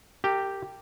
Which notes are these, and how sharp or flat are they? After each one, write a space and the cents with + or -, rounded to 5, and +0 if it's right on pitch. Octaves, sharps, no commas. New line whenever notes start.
G4 +0 A#4 -35